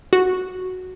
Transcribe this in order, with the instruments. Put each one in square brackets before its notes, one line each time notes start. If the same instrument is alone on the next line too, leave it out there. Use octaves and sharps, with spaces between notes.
[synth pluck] F#4